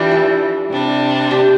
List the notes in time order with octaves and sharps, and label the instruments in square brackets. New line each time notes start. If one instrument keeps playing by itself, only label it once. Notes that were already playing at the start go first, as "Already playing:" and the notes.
Already playing: [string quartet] E3 G3 D4 [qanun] F4 G4
[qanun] A4
[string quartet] C3 G3 D4
[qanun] G4